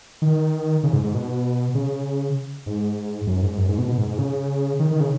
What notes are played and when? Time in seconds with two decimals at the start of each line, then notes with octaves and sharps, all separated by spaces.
0.22 D#3
0.83 C#3
0.93 G#2
1.04 G#2
1.14 B2
1.75 C#3
2.66 G#2
3.27 F#2
3.43 G#2
3.57 F#2
3.68 G#2
3.78 B2
3.88 B2
3.98 G#2
4.09 G#2
4.19 C#3
4.79 D#3
4.91 D#3
5.00 C#3